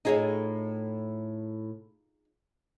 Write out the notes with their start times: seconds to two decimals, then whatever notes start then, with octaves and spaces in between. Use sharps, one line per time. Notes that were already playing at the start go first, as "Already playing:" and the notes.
0.05 A2 D#4 F4 G#4 C#5 D#5